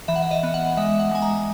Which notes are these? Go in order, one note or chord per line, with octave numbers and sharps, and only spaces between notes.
E3 E5
F#5
E5
D#5
B3
F#5
G#3 E5
F#5
G#3 G#5
A#5